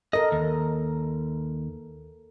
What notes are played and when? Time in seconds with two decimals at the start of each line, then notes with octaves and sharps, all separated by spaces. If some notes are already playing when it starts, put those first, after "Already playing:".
0.13 A4 A#4 D#5
0.32 D#2